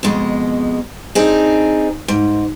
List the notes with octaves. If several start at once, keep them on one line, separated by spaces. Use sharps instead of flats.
F2 B2 G#3
C4 D4 D#4 G#4
G#2